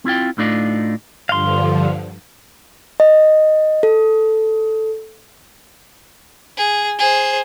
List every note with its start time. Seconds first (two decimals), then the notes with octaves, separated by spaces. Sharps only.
0.05 C4 E4 F4 G5
0.38 A2 A3 D4 D#4 F4 D5
1.29 G2 D3 F3 F5 C6
3.00 D#5
3.83 A4
6.57 G#4
6.99 G#4 C5